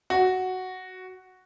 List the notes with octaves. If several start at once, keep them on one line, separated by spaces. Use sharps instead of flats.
F#4